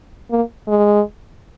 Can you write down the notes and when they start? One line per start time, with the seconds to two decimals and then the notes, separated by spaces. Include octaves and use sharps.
0.31 A#3
0.68 G#3